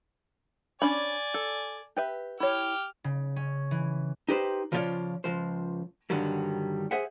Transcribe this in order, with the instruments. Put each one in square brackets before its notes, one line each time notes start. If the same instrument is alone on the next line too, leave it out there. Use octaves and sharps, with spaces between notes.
[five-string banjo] C#4 D4 B5 [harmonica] D5 G#5
[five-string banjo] A4
G4 B4 E5
[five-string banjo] E4 C#5 [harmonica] G4 G5 F6
[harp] C#3
C#4
E3
[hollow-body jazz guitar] D#4 G4 B4 C5
C#3 F3 E4 F4 C#5 D5
C#2 F3 C5
G2 D3 D#3 F#3 G3
G#4 C5 E5 F#5